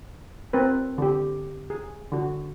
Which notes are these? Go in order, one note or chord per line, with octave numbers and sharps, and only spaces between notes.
C4 A#4 B4
D3 G4
G#4
D3 F#4